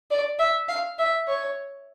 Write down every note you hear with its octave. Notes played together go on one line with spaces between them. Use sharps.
D5
E5
F5
E5
C#5